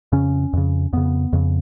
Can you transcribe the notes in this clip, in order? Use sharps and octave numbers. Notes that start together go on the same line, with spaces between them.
F2 C#3 C#4
F2 C#3
F2 C#3 B3
F2 C#3